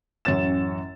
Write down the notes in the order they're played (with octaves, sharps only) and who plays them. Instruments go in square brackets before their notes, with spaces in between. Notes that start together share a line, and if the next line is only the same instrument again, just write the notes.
[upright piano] A1 F#2 C#4 C#5 A6 E7